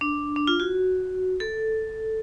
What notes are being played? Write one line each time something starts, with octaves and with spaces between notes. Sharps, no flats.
D4
D4
F4
F#4
A4